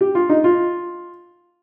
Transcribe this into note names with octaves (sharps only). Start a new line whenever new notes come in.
G4
F4
D#4
F4